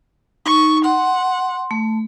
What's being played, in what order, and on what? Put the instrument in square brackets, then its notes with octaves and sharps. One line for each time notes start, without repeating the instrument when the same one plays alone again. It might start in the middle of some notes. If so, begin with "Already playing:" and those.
[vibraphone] D#4 [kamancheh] C#6
[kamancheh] F#5 [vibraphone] C6
[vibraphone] A3